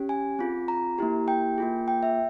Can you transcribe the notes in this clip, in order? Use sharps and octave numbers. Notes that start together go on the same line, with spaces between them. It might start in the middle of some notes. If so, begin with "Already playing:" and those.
Already playing: C#4 G4
G#5
C4 F4 G#4
A#5
A#3 E4 G4
G5
A#3 F4 G#4
G5
E5